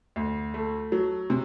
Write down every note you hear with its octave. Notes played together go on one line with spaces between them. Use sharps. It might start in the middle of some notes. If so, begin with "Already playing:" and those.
D2
A3
F#3
C3